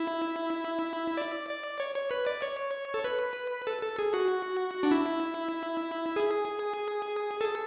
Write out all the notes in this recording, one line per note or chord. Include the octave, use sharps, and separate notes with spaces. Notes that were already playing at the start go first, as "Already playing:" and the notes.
Already playing: E4
D5
D5
C#5
C#5
B4
D5
C#5
A4
B4
A4
A4
G#4
F#4
D4
E4
G#4
A4